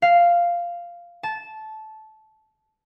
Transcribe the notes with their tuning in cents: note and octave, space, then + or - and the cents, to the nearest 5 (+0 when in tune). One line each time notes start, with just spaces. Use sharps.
F5 -5
A5 -15